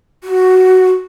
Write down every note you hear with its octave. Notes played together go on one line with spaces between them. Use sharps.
F#4